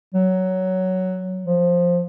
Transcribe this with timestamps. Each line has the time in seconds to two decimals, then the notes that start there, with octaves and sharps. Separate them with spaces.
0.14 F#3
1.43 F3